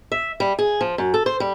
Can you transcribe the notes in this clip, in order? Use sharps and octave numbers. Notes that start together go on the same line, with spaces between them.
E5
G3
G#4
F3
F#2
A4
C5
G3